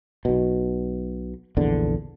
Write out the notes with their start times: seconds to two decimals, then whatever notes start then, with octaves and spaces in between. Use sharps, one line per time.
0.25 B1 B2
1.57 A#1 E2 D3